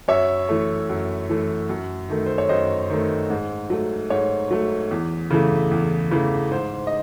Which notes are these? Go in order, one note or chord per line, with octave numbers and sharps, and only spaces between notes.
F#2 C#5 E5
E3 A3
F#2
E3 A3
F#2
D#3 A3
C5
C#5
F#2 C5 D#5
D#3 A3
G#2
F#3 A3
G#2 C#5
F#3 A3
E2
C#3 E3 A3
E2
C#3 E3 A3
G#2 C5
D#5